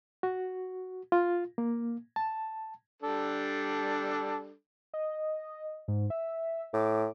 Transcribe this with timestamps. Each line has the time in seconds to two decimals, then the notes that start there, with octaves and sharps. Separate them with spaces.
0.23 F#4
1.12 F4
1.58 A#3
2.16 A5
3.02 G3 D4 A4
4.94 D#5
5.88 G#2
6.10 E5
6.74 A2 D6